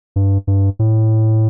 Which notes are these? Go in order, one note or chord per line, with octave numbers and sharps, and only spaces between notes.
G2
G2
A2